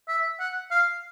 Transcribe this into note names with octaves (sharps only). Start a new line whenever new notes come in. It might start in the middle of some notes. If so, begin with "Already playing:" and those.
E5
F#5
F5